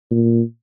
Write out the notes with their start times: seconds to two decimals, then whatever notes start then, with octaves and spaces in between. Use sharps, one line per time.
0.11 A#2